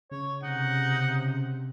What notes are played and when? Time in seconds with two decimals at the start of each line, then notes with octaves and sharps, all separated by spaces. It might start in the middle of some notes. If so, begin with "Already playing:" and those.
0.11 C#3 C#5
0.43 C3 D#4 F#5